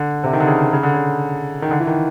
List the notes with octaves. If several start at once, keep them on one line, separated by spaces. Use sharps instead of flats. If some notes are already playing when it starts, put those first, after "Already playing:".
Already playing: D3
C3
D#3
D3
C#3
C#3
D3
C#3
D#3
D3
E3
D#3